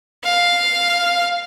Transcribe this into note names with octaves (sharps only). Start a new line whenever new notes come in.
F5